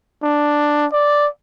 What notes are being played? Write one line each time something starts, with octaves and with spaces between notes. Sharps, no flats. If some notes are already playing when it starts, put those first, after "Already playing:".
D4
D5